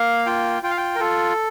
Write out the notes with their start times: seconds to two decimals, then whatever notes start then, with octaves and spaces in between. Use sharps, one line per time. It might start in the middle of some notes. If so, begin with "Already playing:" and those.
Already playing: A#3 F5
0.26 F4 G5
0.63 F4 G5
0.70 F5
0.78 G5
0.95 A#4
1.00 F4 A4